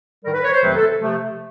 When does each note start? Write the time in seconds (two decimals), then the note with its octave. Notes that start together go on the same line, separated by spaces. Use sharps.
0.24 G#2 D#3 G3 A#4
0.33 B4
0.43 C#5
0.53 C5
0.63 F2 C3 D#3 F#3 A3 B4
0.75 A4
1.01 C3 F3 A3